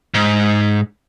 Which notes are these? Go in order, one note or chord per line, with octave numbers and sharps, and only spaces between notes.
G#2